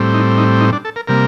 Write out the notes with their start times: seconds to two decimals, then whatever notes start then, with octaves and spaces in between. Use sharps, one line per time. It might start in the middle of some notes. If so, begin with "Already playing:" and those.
Already playing: A2 G3 C4
0.14 D#4
0.37 D#4
0.60 D#4
0.73 D4
0.85 A4
0.96 A#4
1.07 C3 G3 A#3 A#4